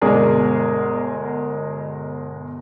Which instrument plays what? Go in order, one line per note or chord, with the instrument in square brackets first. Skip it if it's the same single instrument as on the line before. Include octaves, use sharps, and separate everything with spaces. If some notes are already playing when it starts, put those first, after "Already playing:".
[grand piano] G1 B2 G#3 G#4 A#4 D5